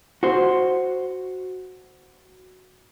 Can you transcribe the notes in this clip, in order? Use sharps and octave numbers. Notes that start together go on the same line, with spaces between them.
F#4 C5